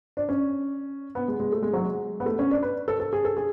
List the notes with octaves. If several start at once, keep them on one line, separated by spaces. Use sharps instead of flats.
D4
C#4
B3
G#3
G#3
A3
G#3
F#3
G#3
B3
A3
C#4
D4
B4
A4
A4
G#4
A4
G#4